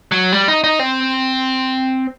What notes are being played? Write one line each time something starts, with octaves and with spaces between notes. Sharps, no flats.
F#3
G3
D#4
D#4
C4